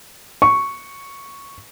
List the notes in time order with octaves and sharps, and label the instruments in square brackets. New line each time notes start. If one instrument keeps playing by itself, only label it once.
[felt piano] C#6